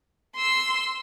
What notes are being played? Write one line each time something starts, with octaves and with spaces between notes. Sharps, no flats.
C6 E6